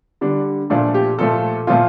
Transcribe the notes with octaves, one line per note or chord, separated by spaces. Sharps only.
D3 G3 D4
A#2 F3 A3 D4
G4
A#2 F3 A3 A4
A#2 F3 A3 F4